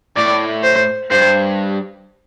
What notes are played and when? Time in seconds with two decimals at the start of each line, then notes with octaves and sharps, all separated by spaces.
0.17 A2 D5
0.63 C5
1.11 G2 C5